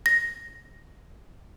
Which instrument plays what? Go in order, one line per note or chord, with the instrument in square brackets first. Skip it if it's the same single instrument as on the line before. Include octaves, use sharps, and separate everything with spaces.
[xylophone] A#6